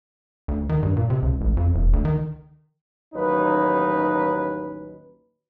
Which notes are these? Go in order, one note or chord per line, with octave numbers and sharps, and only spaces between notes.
D2
D#3
G2
A#2
C3
C#2
A1
F2
E1
D2
D#3
A1 D#2 F#3 C#4 D#4 B4